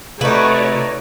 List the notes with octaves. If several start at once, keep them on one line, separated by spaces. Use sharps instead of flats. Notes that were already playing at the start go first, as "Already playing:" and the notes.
C3 A3 D#4 F#4 B4 C#5 D5